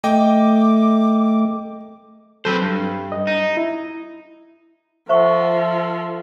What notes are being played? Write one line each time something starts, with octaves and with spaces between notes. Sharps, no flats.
A3 D#5 G5 D6
F#3 C4 A4 B4 C5
G2
D#5
D#4
E4
F3 A4 C5 E5 F#5 C#6